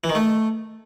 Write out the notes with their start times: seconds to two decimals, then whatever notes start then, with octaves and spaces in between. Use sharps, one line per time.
0.04 E3
0.09 D#3
0.15 A3